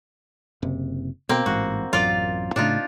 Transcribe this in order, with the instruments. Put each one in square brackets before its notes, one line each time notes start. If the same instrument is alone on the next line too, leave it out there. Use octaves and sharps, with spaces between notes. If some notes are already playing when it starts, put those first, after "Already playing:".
[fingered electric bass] F#1 C3
[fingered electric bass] B2 [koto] A#3 C4
[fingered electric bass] A1 G#2 [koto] F#4
[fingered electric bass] A1 F#2 [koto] F4 D5
[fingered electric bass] A2 C#3 A3 [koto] D4 D#4 F4